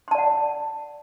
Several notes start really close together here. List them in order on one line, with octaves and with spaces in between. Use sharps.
C6 A5 D5 F#5